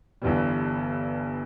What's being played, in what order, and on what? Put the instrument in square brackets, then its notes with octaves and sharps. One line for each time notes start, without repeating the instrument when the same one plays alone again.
[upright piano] G1 G2 E3 G3